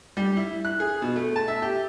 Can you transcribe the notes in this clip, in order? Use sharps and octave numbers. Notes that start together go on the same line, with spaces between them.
G3
E4
F#6
G#4
B2
A3
A5
E5
G4